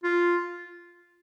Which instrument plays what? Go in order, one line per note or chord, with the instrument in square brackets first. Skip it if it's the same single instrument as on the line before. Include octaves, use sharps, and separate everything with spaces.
[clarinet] F4